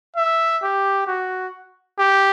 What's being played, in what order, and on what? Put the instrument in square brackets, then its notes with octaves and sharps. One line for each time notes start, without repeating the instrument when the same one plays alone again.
[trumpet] E5
G4
F#4
G4